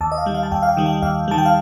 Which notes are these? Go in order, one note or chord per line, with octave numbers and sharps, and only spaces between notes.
D#2 A5
D#5
F5
D#3 G3
F5
A5
D#2 G5
F5
G5
D#3 G3
G5
D#2 F5
D#3 G3 A5
G5
F5